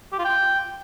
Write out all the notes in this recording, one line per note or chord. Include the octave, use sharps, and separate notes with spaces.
G4
F4
G5